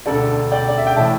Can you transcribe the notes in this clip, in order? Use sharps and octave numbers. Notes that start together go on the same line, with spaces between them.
E1 D2 D3 A4 D5
D5 G5
D5
E5
G5
A2 E3 E5 A5